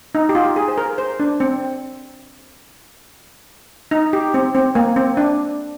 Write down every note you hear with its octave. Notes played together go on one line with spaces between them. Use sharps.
D#4
G4
F4
G#4
C5
A#4
C5
D4
C4
D#4
G4
C4
C4
A#3
C4
D4